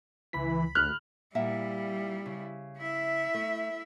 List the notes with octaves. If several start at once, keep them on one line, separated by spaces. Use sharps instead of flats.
C#2 E3 B5 B6
D2 F6 F#6
A#2 G3 E4 E5 F#5
C#3
E4 E5
A3